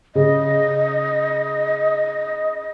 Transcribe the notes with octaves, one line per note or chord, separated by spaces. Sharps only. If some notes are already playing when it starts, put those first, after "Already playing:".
C#3 D#5